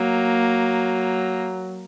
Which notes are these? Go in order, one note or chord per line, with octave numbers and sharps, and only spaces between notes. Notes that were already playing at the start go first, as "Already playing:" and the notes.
Already playing: F#3 A#3